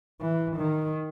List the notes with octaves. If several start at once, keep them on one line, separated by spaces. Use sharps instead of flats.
E3
D#3